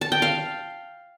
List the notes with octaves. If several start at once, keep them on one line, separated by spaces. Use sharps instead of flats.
A5
G5
F5